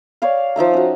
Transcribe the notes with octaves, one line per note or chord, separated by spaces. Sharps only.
C#5 D5 F5
F3 D#4 E5 A#5
C#4 F#4